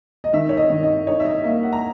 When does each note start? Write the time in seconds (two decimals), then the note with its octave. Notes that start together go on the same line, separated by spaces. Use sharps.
0.24 D#5
0.33 D#3 E5
0.49 C#5
0.57 D#5
0.70 D#3
0.83 D#5
1.07 D#4 C#5
1.20 E5
1.25 D#5
1.44 A#3 E5
1.63 F#5
1.73 A#5